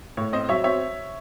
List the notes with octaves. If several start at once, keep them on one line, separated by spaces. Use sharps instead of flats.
A2 C#5
C4 C5 D#5
F#3 C#5 E5
C4 C#5 E5